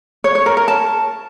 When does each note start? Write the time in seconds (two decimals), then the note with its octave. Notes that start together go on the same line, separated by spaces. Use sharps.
0.24 C#5
0.35 C#5
0.46 A#4
0.57 A#4
0.68 A5